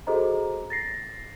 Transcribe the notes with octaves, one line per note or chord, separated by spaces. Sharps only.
F#4 G#4 A4 C5 D#5 A#5
A6 A#6 C7